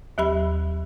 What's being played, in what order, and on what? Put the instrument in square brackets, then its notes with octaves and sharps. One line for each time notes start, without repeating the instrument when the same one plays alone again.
[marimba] D#2 F#3 G4 E5 B5